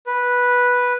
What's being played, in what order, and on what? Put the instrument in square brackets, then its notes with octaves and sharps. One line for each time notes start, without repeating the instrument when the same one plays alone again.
[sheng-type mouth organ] B4